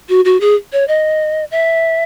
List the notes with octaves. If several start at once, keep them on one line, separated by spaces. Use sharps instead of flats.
F#4
F#4
G#4
C#5
D#5
E5